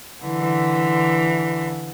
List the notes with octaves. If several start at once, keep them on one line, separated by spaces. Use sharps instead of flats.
D3 E3